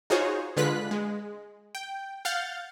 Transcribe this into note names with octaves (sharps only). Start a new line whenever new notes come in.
D#4 F4 F#4 G#4 C5 C#5
D3 G#3 F4 B4 F#6 B6
G#3
G5
F5 F#5 F6 G6 A6